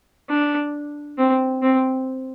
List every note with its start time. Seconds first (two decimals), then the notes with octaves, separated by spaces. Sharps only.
0.30 D4
1.18 C4
1.62 C4